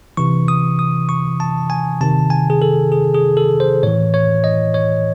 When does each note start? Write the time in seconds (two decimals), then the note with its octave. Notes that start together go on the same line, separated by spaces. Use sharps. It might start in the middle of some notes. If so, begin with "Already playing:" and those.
0.17 C3 E3 C#6
0.48 D#6
0.79 D#6
1.09 C#6
1.40 A5
1.70 G#5
2.01 C3 D#3 A5
2.30 G#5
2.50 G#4
2.62 A4
2.92 G#4
3.14 G#4
3.37 A4
3.60 C5
3.83 A2 E3 C#5
4.14 C#5
4.44 D#5
4.74 C#5